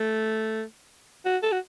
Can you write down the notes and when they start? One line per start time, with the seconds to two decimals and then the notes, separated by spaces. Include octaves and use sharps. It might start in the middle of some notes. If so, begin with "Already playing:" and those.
Already playing: A3
1.25 F#4
1.43 A4
1.52 F#4